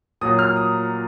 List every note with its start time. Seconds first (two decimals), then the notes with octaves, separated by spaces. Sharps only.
0.21 A#2 F#3 A#3 D#6
0.39 F6
0.56 D#6